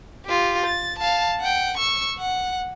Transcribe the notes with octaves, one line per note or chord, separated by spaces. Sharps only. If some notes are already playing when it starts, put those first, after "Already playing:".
F4 G4
A6
F5 A5
F#5 G5
C#6 E6
F#5